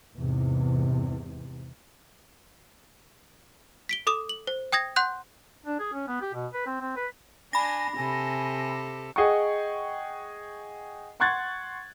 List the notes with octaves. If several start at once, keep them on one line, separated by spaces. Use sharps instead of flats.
E2 G#2 C3
B6 D7 G7
A4 D6 D#6 E7
F#7
C5
G5 D#6 G#6 A#6
F#5 C6 F#6 G6
D4
G#4
C#4
B3
G4
B2
B4
C4
C4
B4
D4 G#5 B5 A#6
C3 G4 A4 G#5
G#4 D#5 F#5 G5 C#6
F#5 C6 C#6 F#6 G#6 A6